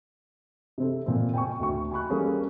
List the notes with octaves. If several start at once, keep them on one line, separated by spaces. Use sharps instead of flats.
C3 C4 A4
A#2 C4
G5 G#5 C#6
D2 C#6
G#5 B5 C#6 F#6
G3 A#3 C#4 G#4 A4